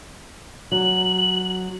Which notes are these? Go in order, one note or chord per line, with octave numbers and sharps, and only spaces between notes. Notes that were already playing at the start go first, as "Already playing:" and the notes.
F#3 F#7